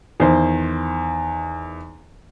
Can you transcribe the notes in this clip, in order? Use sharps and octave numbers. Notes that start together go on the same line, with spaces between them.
E2 D#3 C5